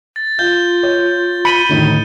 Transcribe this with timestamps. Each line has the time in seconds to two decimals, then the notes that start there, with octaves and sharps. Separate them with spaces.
0.16 A6
0.39 F4 F5 G6 G7
0.83 C#5
1.45 B5 C#7 D#7 G7
1.69 D2 A2 D#3 D#4